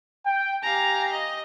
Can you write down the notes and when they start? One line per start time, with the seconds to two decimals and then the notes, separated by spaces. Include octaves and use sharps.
0.25 G5
0.63 G4 F5 G#5 A#5
1.12 D#5